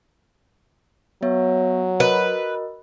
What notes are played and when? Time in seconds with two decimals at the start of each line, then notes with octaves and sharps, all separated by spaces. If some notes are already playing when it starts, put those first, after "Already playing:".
1.22 F#3 B3 C#5 E5
2.00 F#4 A#4 B4 D#5